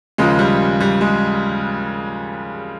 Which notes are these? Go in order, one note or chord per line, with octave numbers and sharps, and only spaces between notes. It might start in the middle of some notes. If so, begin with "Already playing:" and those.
D#2 C#3 F3 G#3
G3
G3
G#3